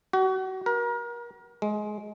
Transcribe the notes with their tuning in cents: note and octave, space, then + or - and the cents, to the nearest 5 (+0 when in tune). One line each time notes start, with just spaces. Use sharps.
F#4 +35
A#4 +35
G#3 +20